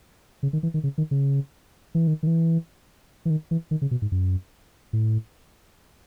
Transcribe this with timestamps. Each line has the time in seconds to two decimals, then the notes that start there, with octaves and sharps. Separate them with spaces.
0.43 C#3
0.53 D#3
0.63 E3
0.74 D#3
0.83 C#3
0.98 D#3
1.11 C#3
1.95 E3
2.07 D#3
2.23 D#3
2.27 E3
3.25 E3
3.30 D#3
3.51 E3
3.71 D#3
3.82 C#3
3.91 B2
4.02 G#2
4.12 F#2
4.93 A2